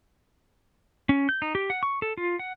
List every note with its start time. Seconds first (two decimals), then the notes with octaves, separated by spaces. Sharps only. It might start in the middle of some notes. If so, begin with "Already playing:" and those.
1.09 C#4
1.29 G6
1.42 D#4
1.55 G4
1.70 F#5
1.83 C#6
2.02 A4
2.17 F4
2.39 F#5